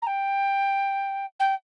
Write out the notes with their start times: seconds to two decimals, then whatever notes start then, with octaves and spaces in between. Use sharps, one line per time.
0.02 A#5
0.07 G5
1.39 G5